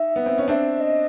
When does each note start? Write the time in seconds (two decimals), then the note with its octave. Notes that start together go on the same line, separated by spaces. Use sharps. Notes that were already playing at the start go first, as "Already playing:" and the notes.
Already playing: D#4 E5
0.16 B3
0.26 C4
0.38 C#4
0.48 C4 D4 E5
0.80 D#5